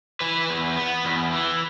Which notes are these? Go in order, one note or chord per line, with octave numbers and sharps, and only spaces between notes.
E3 B4
E2
B3
E2
E3